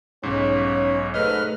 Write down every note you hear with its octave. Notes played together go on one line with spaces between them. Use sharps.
B1 G#2 C#4 C#5
G#2 A3 B4 D#5 F6